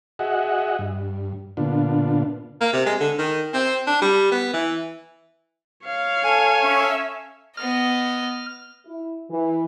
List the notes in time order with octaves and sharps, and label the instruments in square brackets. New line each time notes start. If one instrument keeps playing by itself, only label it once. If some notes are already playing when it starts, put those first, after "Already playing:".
[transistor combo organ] F#4 G#4 D#5 E5 F#5
G2
A#2 D3 B3 D4 F4
[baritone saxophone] A#3
C3
G#3
D3
D#3
C4
D4
G3
B3
E3
[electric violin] C#5 F5
[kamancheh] A4 G#5
[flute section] C#4 E5
[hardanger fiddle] B3 D#5 [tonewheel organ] F6
[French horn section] E4
E3